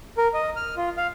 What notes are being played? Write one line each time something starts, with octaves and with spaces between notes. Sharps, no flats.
A#4
D#5
F6
F4
F5